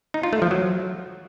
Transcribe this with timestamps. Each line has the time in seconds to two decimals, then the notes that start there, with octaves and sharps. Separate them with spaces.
0.14 D#4
0.23 F4
0.33 A3
0.42 F3
0.51 F#3